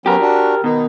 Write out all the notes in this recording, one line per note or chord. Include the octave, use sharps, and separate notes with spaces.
F#3 B3 C#4 G4 A#4
D4 F#4
B2 D#3 D#4